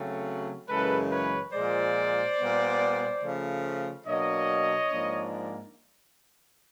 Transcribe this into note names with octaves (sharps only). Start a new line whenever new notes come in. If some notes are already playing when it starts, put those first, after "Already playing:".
Already playing: C#3 F#3 A3 C4
F#2 C#3 E3 G#3 A4 B4
B4 C#5
A#2 F3 G#3 C5 D5
A#2 G3 B3
C#3 F3 A3
B2 F#3 A#3 D4 C#5 D#5
G#2 F3 A#3 D4